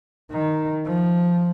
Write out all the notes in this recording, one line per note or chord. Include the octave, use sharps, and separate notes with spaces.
D#3
F3